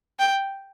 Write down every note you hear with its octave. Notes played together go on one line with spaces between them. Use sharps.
G5